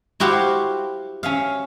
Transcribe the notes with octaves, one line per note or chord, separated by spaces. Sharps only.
E4 F#4 G4 C5 F5
C#4 E5 F5